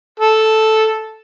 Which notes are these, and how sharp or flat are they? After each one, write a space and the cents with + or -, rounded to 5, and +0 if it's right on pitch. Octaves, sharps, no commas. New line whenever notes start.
A4 -5